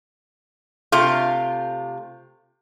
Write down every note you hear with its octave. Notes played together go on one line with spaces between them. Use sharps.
C3 A3 F4